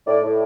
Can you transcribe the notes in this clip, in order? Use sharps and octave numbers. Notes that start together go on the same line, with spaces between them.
A2 D5
A2